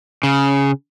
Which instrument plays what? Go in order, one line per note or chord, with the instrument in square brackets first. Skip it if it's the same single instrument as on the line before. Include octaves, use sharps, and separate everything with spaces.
[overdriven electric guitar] C#3